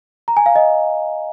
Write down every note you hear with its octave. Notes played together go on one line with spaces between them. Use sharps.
A#5
G#5
F5
D#5